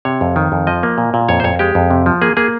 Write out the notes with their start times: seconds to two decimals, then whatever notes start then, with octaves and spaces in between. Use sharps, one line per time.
0.05 C3 C#5
0.21 F2
0.36 D#3
0.52 F2
0.67 F3 D#5
0.83 A#3
0.98 A#2
1.14 A#2
1.29 F2 C#5
1.40 C5
1.44 F2 C#5
1.59 G#3 G4
1.75 F2
1.90 C3
2.06 F3
2.22 A#3 G#4
2.37 A#3 G#4